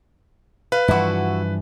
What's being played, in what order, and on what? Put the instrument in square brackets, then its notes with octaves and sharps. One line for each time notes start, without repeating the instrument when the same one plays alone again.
[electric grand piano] B4 [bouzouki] F5
[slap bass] G2 E3 F3 [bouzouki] E4 F#4